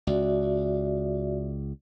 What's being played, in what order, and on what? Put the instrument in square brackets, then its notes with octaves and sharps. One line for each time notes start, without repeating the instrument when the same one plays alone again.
[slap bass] C#2 [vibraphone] F#4 D5 E5